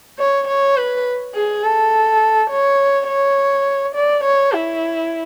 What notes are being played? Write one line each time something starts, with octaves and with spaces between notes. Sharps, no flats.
C#5
C#5
B4
G#4
A4
C#5
C#5
D5
C#5
E4